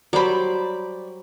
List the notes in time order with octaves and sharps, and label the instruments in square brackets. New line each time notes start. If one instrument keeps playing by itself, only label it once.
[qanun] F#3 G3 C5 [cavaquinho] D5 B5